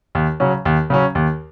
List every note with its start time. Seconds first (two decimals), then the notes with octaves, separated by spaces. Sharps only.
0.15 D#2
0.40 C#3 F#3 C#4
0.65 D#2
0.90 C#3 F#3 C#4
1.15 D#2